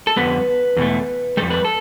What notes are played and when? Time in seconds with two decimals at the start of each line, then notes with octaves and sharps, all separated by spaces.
0.07 A4
0.16 F2 D3 G3 B3 B4
0.77 E2 B2 A3
1.37 C3 G3 A4
1.42 F2
1.50 B4
1.65 A4